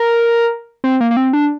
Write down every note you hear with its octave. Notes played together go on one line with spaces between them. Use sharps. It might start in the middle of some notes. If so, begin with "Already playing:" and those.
Already playing: A#4
C4
A#3
A#3
C4
D4